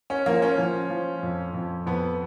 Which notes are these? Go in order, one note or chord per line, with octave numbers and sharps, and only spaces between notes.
C#4
F3 A#3
C#4
F3
F3
F2
F2
F2 B3